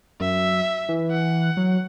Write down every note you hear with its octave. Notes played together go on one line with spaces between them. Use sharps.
F#2 E5
E3
F#5
F#3